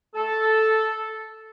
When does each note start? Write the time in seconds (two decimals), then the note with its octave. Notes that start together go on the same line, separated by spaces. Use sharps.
0.15 A4